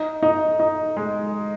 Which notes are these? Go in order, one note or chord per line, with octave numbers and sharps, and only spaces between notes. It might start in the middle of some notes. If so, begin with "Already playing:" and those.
Already playing: D#4
D#4
D#4
G#3